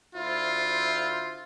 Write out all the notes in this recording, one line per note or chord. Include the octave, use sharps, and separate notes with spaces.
D2 E4 F4 C5